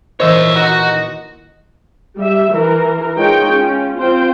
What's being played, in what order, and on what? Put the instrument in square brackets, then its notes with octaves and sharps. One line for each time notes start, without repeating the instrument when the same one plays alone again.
[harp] D#1 E3 A#4 [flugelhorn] C5 [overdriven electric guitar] C#5 E5 [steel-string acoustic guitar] D#5
[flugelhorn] D#4 [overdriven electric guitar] F#4
[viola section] G3 E5
E3 A#4
G#3 D#4 F4 G#4 C#5 G5
C#4 F4
C4 F4 C5 G5